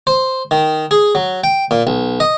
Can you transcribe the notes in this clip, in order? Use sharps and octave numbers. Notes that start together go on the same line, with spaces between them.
C5
D#3
G#4
F#3
G5
A#2
B1
D#5